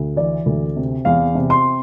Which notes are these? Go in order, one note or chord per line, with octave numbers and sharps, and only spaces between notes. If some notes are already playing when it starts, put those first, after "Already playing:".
Already playing: D2
E3 D5
D2
C3
E2 F5
C3
C6